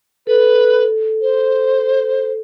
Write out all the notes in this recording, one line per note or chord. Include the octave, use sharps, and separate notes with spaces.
A4 B4
C5